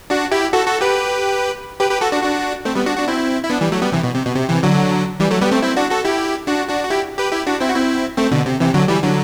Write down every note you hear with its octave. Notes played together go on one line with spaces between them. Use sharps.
D4 F#4
E4 G4
F#4 A4
F#4 A4
G4 B4
G4 B4
G4 B4
F#4 A4
D4 F#4
D4 F#4
A3 C4
G3 B3
D4 F#4
D4 F#4
C4 E4
E4
B3 D4
E3 G3
F#3 A3
G3 B3
C3 E3
B2
C3
B2
C3
C3 E3
D3 F#3
E3 G3
F#3 A3
G3 B3
A3 C4
C4 E4
D4 F#4
F#4 A4
E4 G4
D4 F#4
D4 F#4
F#4
E4 G4
G4 B4
E4 G4
D4 F#4
C4 E4
F#4
C4 E4
A3 C4
B2 D3
C3
C3 E3
D3 F#3
E3 G3
D3 F#3